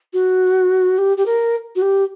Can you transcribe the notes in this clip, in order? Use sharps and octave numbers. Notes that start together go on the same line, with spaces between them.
F#4
G4
G4
A#4
F#4
G4